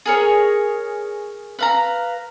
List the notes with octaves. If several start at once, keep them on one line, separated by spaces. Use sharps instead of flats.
G#4 A#4 C#5
B4 F5 A#5